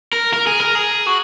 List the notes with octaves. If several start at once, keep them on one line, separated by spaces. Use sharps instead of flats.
A#4
A#4
G#4
A#4
G#4
F#4